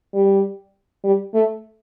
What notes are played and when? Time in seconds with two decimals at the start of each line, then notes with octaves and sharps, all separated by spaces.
0.14 G3
1.04 G3
1.34 A3